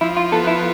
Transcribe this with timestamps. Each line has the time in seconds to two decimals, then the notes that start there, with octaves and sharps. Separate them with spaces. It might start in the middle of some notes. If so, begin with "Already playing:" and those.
0.01 F3 E4
0.17 F4
0.32 B3 A4
0.47 E4